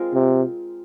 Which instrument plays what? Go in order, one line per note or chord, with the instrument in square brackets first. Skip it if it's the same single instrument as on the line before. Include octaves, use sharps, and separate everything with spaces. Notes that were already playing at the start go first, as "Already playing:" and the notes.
Already playing: [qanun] G#3 C4 F4 A#4
[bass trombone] C3